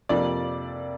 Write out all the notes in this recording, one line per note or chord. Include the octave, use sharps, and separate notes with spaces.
F2 C3 F3 A#3 D5